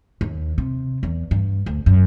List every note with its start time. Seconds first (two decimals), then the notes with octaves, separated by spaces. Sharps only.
0.21 D#2
0.58 C3
1.03 E2
1.31 G2
1.66 D2
1.86 F#2